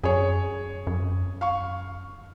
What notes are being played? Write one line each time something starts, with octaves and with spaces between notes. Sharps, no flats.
F#2 G#4 C#5
F#2
F5 C#6